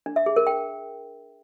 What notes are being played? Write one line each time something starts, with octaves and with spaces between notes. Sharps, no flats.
D4
E5
G#4
A#4
G5